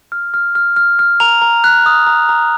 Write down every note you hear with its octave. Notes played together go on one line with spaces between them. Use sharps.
F6
F6
F6
F6
F6
A#5 F7
A#5
F#6
D#6
A#5
A#5